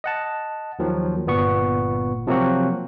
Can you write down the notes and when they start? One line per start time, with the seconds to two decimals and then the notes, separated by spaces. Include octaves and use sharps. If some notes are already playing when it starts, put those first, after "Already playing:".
0.04 D#5 F#5 A5
0.79 D#2 D#3 F3 F#3
1.26 G1 A#2 B3 C#6
2.27 C3 F3 F#3 A#3 C4 F#4